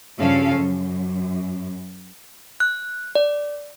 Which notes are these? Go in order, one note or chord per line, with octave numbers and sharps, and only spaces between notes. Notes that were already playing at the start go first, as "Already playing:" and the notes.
G2 C#3 F3 C#4 A4 F5
F#2
F#6
D5